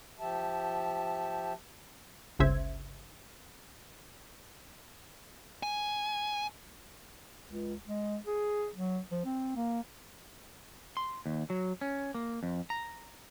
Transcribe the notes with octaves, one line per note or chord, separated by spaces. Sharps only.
F3 G4 E5 A5
G1 C#2 C#3 C5 E5 G#6
G#5
C#2
G#3
G#4
F#3
F3
C4
A#3
C6
D#2
F#3
C#4
A#3
F2
A#5